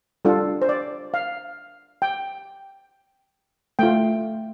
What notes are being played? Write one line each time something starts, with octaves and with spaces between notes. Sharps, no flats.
G3 D4 F4 A4
C5
D5
F5
G5
A3 F4 G5